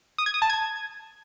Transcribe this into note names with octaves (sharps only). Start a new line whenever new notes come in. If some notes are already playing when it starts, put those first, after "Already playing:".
D#6
G#6
D#6
A5
G#6